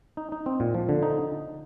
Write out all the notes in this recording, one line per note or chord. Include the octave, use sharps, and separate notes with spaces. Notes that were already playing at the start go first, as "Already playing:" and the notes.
D#4
D#4
C4
A#2
F3
D3
D#4